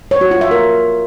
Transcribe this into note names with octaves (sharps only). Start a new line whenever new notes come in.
C#5
F#4
F4
E5
A#4